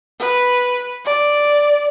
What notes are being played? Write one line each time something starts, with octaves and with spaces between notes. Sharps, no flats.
B4
D5